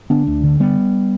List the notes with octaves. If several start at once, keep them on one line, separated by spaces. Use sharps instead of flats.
D3 B3 D4
D2
D3
G3 B3